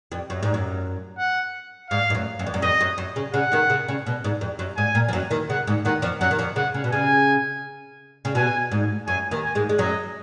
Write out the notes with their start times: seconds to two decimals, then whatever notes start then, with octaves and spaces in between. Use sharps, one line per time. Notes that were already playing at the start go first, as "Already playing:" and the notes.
0.12 F2
0.30 F#2
0.43 G#2
0.54 F#2
1.19 F#5
1.90 G#2 F5
2.10 G#2
2.15 F#2
2.39 F#2
2.46 F2
2.54 F#2
2.62 F2 D#5
2.81 F#2
2.98 F#2
3.16 C#3
3.34 C#3 F#5
3.52 D#2 D#3
3.70 C#3
3.88 C#3
4.06 B2
4.24 G#2
4.41 F2
4.59 F#2
4.77 G#2 G#5
4.95 A#2
5.08 F3
5.13 F#2 F#3
5.31 D#2 D#3
5.50 C#3 F#5
5.67 G#2
5.85 D#2 D#3 F#5
6.02 F2 F3
6.20 F#2 F#3 F#5
6.31 D#3
6.39 F2 F3
6.56 C#3 F#5
6.74 C#3
6.84 B2
6.92 C#3 G#5
8.25 C#3
8.35 B2 G#5
8.72 G#2
9.07 F#2 G#5
9.31 D#2 D#3
9.43 G#5
9.55 G#2 G#3
9.69 G#3
9.78 F#2 F#3 D#5